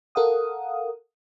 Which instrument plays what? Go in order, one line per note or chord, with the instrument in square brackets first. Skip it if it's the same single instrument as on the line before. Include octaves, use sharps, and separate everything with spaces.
[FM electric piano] A4 A#4 F5 F#5 D#6